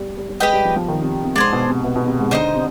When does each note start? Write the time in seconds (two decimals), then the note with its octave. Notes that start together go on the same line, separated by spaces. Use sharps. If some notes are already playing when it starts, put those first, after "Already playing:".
Already playing: G3 B3
0.17 G3
0.29 G3
0.40 G#3 G4 B4 D#5 G5
0.53 G3
0.65 F3
0.76 F3
0.88 D#3
1.01 C3
1.24 C3
1.35 G#2 D4 G#4 C5
1.52 B2
1.68 C3
1.84 B2
1.96 B2
2.07 C3
2.19 G#2
2.31 D3 D#4 G4 C5 D#5
2.54 C3